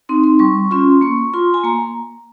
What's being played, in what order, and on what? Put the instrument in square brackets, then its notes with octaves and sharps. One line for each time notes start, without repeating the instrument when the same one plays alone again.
[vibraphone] C4 D#4 C6
C6
G3 C#6
C#4 F4 C6
A#3 C#6
F4 C6
G#5
A#3 A#5